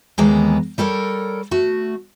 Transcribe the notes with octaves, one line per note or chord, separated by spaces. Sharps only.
D#2 E3 G#3 A#3 B3 A#5
G3 A4 A#4 C#5
A3 F#4